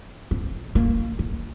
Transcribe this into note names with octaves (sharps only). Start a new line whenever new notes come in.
C4
A#3
A#3